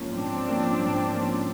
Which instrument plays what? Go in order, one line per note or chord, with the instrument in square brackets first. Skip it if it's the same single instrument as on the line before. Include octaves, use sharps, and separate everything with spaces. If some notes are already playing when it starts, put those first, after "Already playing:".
Already playing: [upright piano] G#2 F3 A#3 C#4
[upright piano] G#2 [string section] C4 D4
[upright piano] F3 A#3 C#4
G#2
F3 A#3 C#4